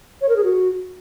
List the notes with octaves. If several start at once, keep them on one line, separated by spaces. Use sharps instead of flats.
C#5
A#4
G#4
F#4